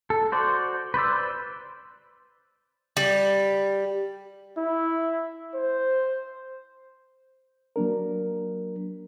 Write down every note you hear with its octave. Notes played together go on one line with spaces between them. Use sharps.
A4
F#4 C5 D5
B4 C5 D5 E6
G3
E4
C5
F#3 A#3 D4 A#4